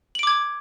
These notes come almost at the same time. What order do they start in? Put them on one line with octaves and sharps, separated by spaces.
F#7 D7 D6 G#6